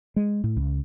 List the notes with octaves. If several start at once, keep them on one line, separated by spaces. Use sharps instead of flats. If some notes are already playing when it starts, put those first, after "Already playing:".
G#3
A2
C#2